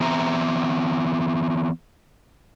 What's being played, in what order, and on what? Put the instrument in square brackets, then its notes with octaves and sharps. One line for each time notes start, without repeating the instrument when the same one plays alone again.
[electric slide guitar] E3 B3 C4 E5 A#5